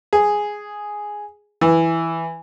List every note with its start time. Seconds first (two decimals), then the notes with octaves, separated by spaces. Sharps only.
0.13 G#4
1.61 E3